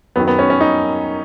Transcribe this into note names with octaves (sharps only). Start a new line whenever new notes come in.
F#2 D#3 B3
B3
C#4
C#4
D#4